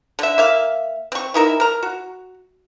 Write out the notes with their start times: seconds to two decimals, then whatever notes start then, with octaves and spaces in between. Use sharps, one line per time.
0.19 D3 E5
0.38 A#3 E5 F5
1.12 C4 C#6
1.34 E3 D#4 A#4 E5
1.60 A#4 A#5
1.83 F#4